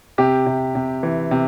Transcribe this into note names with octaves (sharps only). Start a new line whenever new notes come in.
C3 G4
C3
C3
E3
C3